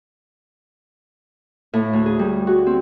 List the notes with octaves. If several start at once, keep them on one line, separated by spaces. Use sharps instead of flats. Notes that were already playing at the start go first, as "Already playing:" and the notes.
A2
D2
G#4
G3
F#4
C4